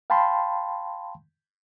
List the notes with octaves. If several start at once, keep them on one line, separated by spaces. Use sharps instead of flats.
F5 G5 A5 B5 C6